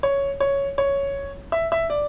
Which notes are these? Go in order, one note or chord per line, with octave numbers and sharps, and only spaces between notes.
C#5
C#5
C#5
E5
E5
D5